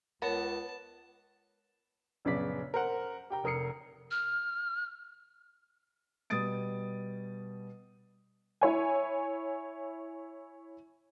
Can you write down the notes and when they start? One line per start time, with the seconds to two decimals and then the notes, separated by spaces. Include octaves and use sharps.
0.22 C#2 B3 A#4 C#5 A5
2.25 A#1 F#2 C#3 B3 D5 B6
2.74 A#4 C5 F#5
3.30 G4 G5 A#5
3.44 F1 A#4 D#6 C7 C#7
4.11 F6
6.30 B2 G3 D#6 A6 D7
8.61 E4 C#5 G#5